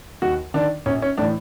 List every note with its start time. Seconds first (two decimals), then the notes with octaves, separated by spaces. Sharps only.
0.22 D#2 F#4
0.54 D#3 D4
0.86 A#1 C#4
1.02 C#4
1.17 A2 E3 D4